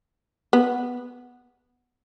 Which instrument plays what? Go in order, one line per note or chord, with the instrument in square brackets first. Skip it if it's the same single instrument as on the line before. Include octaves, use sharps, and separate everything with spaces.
[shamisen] B3